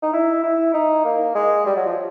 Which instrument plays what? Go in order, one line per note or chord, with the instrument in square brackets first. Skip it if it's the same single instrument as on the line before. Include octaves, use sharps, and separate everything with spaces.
[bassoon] D#4
E4
E4
D#4
A#3
G#3
G3
F#3
F3